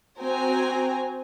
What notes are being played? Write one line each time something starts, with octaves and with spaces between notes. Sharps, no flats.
C4 F#4 C5 G5 G#5 A#5